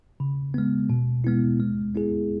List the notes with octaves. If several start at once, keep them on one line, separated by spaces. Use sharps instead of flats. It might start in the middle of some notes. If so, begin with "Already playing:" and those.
C#3
G#3 B3
B2
G#3 B3 E4
G#3
B3 E4 G#4